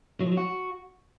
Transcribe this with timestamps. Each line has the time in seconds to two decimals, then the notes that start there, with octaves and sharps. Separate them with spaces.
0.21 F#3
0.26 F3
0.32 F#3
0.37 F#4